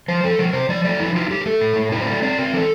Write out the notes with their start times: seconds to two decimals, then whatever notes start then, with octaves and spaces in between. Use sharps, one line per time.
0.08 F3 C5
0.24 F3 A4
0.39 F3 A#4
0.53 C3 C5
0.69 F3 D5
0.84 A3 D5
1.00 F3 E4
1.16 E4 F4
1.31 A3 G4
1.41 A#4
1.46 A3 A4
1.61 A2
1.76 A2
1.92 E4 A#4
2.01 C5
2.07 A3 D5
2.22 C4 D5
2.38 C4 A#4
2.53 E3 A4